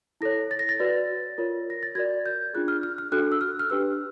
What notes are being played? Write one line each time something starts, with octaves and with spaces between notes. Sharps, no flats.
E4 A4 C#5 A#6
A6
A#6
A6
F#4 B4 D5
F4 A#4 C#5
A#6
A6
F#4 A#4 D5 G#6
G6
D4 F4 G#4 F#6
F6
F6
F6
D4 F#4 A4 F#6
E6
F6
F6
D4 G4 B4 E6